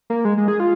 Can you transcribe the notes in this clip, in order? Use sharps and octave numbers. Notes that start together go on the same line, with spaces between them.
A#3
G#3
G#3
G#4
F4